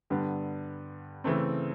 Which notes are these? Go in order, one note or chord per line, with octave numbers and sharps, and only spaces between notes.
G2 D3 G3 B3
C#3 E3 A3 C4